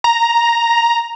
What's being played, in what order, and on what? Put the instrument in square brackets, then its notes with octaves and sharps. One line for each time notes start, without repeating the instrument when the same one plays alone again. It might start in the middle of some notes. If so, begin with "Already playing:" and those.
[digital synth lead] A#5